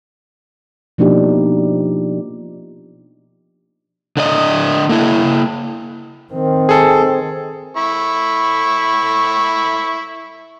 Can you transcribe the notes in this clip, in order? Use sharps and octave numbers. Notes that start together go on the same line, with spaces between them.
B2 F3 A#3 D4 D#4 G4
D3 D5 D#5
A#3 E4
D#3 C4
G#4 A4
E4 B5 C#6